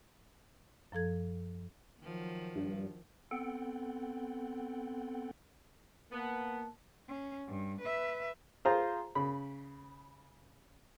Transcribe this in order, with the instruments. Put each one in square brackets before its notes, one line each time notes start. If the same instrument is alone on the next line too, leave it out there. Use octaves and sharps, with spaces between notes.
[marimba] F#2 F3 A4 G#6
[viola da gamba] D#3 F3 F#3
[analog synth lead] G2
[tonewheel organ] B3 C4 A4 F#5 G5
[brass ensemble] A#3 A5 [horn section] B3
[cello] C#4
G2
B4 E5
[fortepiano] F4 G#4 C5 A#5
C#3 B5